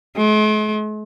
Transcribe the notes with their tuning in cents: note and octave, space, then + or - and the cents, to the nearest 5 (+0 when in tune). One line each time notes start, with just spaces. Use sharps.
G#3 +45